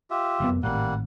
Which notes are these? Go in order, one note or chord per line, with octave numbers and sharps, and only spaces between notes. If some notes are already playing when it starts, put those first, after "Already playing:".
F4 G4 E5
F1 F#2 B3
G#1 A2 G3 A#3 F#5